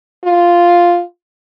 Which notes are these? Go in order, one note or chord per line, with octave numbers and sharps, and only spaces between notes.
F4